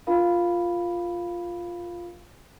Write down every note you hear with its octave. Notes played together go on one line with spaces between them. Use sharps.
D4 F4 A#4 F5 B5